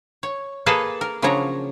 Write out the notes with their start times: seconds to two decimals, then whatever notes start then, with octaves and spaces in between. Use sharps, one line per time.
0.23 C#5
0.66 A#3 G#4 A4 B4 A5 A#5
1.01 A#4
1.22 C#3 F3 F#3 D4 C#5 A#5